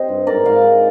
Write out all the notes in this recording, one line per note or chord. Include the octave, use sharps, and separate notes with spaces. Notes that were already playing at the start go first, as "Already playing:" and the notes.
Already playing: C3 C5 D#5
G2
G#2 A#4 D5
G#2 D5 F5
G#3